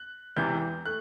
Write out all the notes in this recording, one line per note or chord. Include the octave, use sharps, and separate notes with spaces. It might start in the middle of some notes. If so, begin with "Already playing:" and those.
Already playing: F#6
E1 E2 C3 E3 G6
A3 F#6